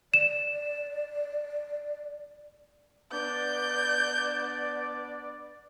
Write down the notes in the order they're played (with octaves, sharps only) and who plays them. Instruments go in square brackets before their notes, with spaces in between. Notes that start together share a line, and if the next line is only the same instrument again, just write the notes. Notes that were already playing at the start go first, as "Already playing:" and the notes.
[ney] D5 [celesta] E7
[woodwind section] B3 D4 D5 [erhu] G6